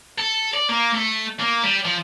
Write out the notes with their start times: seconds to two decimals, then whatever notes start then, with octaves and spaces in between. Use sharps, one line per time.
0.18 A4
0.54 D5
0.69 A#3
0.94 A3
1.40 A#3
1.64 G3
1.85 F3